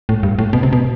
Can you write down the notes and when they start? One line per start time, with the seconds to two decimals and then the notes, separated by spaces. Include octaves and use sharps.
0.09 A2
0.23 G2
0.39 A2
0.53 B2
0.63 C3
0.73 B2